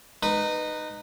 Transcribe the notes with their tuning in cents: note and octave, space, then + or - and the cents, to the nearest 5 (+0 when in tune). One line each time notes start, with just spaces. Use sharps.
D#4 -20 B4 +0